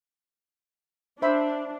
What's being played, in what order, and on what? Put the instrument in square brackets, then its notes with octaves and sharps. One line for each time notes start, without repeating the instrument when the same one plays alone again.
[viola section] D4 [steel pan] C5 E5 B5